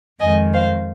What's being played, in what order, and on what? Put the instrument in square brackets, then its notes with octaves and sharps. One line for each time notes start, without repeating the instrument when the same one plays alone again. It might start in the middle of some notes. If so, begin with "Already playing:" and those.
[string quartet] F2 D#3 G#3 D#5 G#5
C5 F5